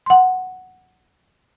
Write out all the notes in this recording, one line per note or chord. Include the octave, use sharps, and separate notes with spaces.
F#5 C6